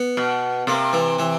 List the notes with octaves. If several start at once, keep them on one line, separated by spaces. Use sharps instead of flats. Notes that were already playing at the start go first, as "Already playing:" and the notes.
Already playing: B3
B2
C3 A#3
E3
E3